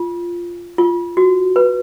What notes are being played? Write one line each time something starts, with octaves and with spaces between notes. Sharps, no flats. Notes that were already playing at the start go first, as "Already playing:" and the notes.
Already playing: F4
F4
F#4
B4